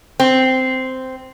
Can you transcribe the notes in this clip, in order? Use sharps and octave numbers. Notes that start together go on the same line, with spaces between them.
C4